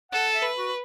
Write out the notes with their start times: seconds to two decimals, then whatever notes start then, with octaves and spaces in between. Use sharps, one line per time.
0.12 A4 F#5
0.34 E5
0.42 B4
0.57 F#4